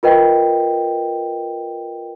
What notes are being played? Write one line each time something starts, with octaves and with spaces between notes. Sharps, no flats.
F4 A#4 B4 D#5 G5